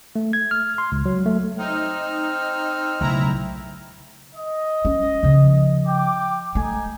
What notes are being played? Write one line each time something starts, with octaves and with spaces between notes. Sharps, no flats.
A3
G#6
F6
C6
C#2
F#3
A3
C4 D#4 F6
B1 C#3 A3 E4 A#5
D#5
C#4
C#3 F3
G5 D6
A3 D#4 G#5